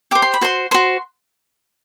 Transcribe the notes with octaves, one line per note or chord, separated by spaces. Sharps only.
G4 C5 D6
C6
B5
F#4 C5 C6
F#4 C5 C6